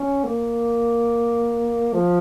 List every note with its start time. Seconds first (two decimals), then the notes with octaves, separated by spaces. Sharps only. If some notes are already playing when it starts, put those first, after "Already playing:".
Already playing: C#4
0.24 A#3
1.93 F3